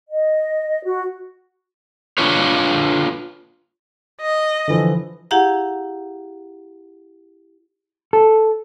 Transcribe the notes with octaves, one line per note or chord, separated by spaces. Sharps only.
D#5
F#4
D4 F4 B4 C#5
D#5
D3 E3 F3
E4 G4 G#4 F5 F#5 A#5
A4